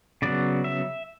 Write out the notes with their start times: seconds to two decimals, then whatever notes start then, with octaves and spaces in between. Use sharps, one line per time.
0.22 C#3 F#3 B3 D5
0.64 E5